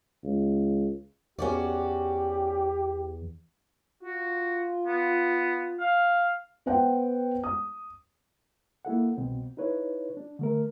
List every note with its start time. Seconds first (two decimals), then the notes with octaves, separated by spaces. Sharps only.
0.24 C#2
1.39 E2 C#4 F#4 G4 D5
4.03 F4 F#4
4.87 B3
5.80 F5
6.66 B3 C5 F#5 G5
7.43 D#6
8.85 A#3 E4 A4 F#5
9.17 C2 B2 C4
9.57 D#4 E4 B4 C#5
10.17 D4
10.39 D3 A3 A#4